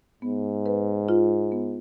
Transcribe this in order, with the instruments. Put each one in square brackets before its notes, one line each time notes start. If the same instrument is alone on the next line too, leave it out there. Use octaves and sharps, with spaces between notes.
[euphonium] G#2 [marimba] B3
[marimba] B4
F4
B3